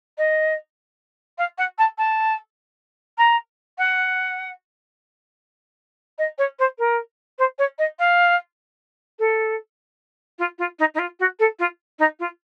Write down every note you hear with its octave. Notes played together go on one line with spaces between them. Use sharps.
D#5
F5
F#5
A5
A5
A#5
F#5
D#5
C#5
C5
A#4
C5
C#5
D#5
F5
A4
F4
F4
D#4
D#4
F4
F#4
A4
F4
D#4
F4